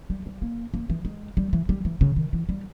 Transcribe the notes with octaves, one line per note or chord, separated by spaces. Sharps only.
G3
G3
A#3
A#3
E3
G#3
G3
E3
G3
E3
C#3
D#3
E3
G3